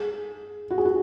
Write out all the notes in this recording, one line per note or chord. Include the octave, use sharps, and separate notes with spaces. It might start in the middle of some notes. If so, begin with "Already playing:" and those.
Already playing: G#4
F#4
G#4
F#4